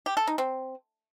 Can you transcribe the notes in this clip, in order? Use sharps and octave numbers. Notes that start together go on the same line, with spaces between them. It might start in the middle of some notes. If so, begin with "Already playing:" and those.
G4
A4
D#4
C4